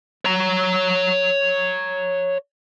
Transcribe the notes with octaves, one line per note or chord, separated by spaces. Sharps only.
C#5 A#5